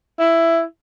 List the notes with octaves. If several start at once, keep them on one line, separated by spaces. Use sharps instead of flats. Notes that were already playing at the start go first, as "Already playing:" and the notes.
E4